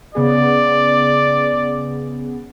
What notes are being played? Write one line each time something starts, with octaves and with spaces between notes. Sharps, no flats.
C#3 B3 G#4 D5